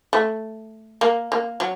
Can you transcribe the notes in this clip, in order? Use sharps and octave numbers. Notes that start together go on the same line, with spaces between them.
A3
A#3
A#3
F#3